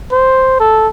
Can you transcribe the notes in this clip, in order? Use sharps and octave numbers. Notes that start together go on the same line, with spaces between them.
C5
A4